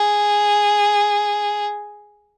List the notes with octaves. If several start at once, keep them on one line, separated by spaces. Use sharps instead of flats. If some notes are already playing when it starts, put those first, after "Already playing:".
Already playing: G#4